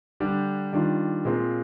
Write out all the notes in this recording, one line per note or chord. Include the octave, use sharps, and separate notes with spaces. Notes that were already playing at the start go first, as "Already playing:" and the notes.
D3 G3 D4 G4
D#3 G3 D4 F4
A#2 G#3 C4 F4